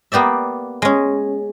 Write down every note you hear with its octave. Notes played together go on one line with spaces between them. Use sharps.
A#3 B3 G4 D5 E5
G#3 C#4